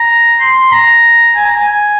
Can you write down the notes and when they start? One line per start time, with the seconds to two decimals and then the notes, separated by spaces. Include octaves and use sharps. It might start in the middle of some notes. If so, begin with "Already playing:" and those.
Already playing: A#5
0.40 C6
0.72 A#5
1.36 G#5
1.45 A#5
1.56 G#5
1.67 G#5